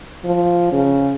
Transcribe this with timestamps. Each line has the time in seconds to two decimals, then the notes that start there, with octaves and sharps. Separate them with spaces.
0.25 F3
0.72 C#3